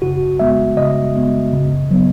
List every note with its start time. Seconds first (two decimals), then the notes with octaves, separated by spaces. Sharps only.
0.02 C#3 F#4
0.39 G#3 B3 E5
0.77 C#3 D#5
1.15 G#3 B3
1.53 C#3
1.91 F#3 B3